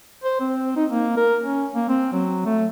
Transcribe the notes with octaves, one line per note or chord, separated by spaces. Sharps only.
C5
C4
D#4
A#3
A#4
C#4
A#3
C4
F#3
A3